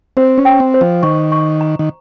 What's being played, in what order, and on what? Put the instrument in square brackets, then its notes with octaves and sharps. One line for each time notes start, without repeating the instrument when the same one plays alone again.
[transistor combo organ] C4 [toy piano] C5
[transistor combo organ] C#4
[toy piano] G5
[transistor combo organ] C4
[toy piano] C5
[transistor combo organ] F3
[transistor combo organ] D#3 [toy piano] C#6
[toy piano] C#6
A#5
[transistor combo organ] D#3